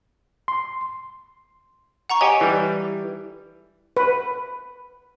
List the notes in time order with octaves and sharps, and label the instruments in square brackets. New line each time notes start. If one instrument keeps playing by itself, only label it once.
[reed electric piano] C6
[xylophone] F#5 A#5 C#6
[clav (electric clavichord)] G4 C#5 D#5 [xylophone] G#5
[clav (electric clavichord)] E3 G3
[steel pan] B4